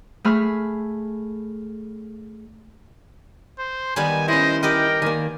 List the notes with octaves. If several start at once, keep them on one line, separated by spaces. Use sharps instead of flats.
A3 G#4 B5 F6
C5
D#3 G3 B3 G#5
C#4 E4 C5 D#5
G4 A#4 B4 D#5 G5
D#3 A#3 D5 G#5